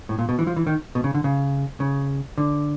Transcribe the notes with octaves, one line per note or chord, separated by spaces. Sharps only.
A2
A#2
B2
E3
F3
E3
D#3
B2
C#3
D3
C#3
C#3
D3